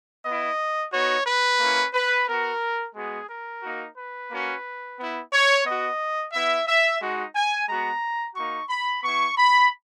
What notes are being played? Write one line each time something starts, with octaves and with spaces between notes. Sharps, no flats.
B3 E4 D#5
B3 D#4 F#4 C#5
B4
A#3 C#4 E4
B4
B3 F#4 A#4
G#3 B3 F#4 G#4
A#4
A#3 D#4 F#4
B4
A#3 C#4 F#4
B3 E4
C#5
B3 F#4 D#5
B3 E4 E5
E5
G#3 D#4 F#4
G#5
G#3 B3 F#4 A#5
A#3 D#4 F#4 C#6
B5
B3 E4 C#6
B5